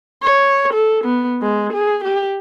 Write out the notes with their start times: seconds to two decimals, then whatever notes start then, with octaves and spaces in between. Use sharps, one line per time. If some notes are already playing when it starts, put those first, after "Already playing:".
0.23 C#5
0.73 A4
1.05 B3
1.41 G#3
1.73 G#4
2.04 G4